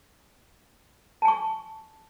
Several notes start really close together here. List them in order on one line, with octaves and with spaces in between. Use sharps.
A5 G#5 C#6